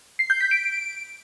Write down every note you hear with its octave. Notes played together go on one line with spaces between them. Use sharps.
C7
G6
B6
D7